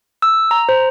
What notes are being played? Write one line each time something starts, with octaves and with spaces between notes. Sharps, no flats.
E6
A#5
C5